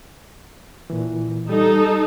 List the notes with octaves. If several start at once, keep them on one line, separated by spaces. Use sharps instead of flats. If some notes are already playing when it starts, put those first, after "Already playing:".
A#2 E3
G3 D#4 A4